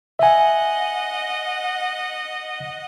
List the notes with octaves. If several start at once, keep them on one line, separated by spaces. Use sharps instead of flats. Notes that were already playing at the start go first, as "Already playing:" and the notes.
D#5 E5 F#5 G#5